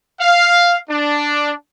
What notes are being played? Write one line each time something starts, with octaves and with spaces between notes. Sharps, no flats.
F5
D4